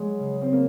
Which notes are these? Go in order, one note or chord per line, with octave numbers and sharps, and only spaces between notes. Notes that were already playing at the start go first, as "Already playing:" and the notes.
Already playing: F#3 G#3
C#3
C4
A#3